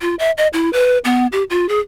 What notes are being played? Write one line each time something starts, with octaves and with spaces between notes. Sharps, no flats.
F4
E5
D#5
E4
B4
B3
G4
F4
G#4